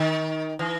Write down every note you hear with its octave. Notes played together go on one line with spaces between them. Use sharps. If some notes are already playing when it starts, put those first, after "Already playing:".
Already playing: D#3
E3